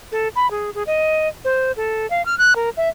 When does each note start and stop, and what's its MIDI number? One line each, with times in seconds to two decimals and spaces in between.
0.12 0.28 69
0.36 0.50 83
0.51 0.70 68
0.75 0.83 68
0.87 1.28 75
1.45 1.72 72
1.77 2.09 69
2.10 2.25 77
2.26 2.38 89
2.38 2.54 90
2.56 2.70 70
2.77 2.89 76